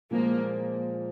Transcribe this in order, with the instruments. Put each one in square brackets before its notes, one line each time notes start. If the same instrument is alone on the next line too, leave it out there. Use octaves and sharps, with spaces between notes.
[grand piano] A#2 F3 G#3 [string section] A#3